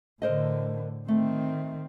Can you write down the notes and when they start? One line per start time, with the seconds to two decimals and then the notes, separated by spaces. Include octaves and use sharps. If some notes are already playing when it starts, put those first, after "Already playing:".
0.22 A2 D3 A#4 C5 D#5
1.08 D#3 A3 C4